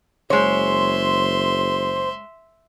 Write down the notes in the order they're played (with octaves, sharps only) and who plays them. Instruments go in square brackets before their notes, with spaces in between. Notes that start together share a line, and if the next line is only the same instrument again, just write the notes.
[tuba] F#1 [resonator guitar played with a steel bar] G#3 C#5 [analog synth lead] C5 [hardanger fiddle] E5 C6